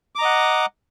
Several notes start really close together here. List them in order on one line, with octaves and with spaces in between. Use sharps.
D6 A#5 D#5 F#5